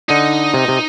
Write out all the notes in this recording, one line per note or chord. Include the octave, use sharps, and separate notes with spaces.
D3 D#4
C3
C3